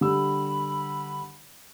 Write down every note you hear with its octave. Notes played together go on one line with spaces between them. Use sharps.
D3 G3 B5 E6